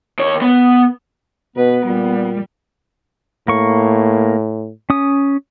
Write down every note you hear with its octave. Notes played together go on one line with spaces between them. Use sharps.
D#2 C#5
B3
B2 B3 B4
A#2 G3
A2 A#3 C#6
C#4 D#6